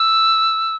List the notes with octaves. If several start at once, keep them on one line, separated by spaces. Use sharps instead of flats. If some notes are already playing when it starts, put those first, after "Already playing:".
Already playing: E6